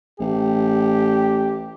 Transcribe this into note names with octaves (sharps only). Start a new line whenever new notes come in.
A1 G4